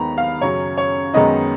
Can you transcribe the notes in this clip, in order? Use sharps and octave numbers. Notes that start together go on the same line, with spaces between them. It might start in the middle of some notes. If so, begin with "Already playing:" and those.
Already playing: D#2 D#3 G#3 B3 A#5 B5
F5
F#2 C#3 F#3 C#4 C#5
C#5
F#2 D#3 G#3 B3 D#4 D#5